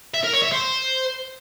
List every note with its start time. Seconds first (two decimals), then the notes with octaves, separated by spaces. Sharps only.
0.14 E5
0.24 A#4
0.33 C#5
0.43 E5
0.52 C5